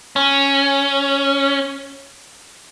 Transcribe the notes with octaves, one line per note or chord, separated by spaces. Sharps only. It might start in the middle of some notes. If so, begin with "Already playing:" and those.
C#4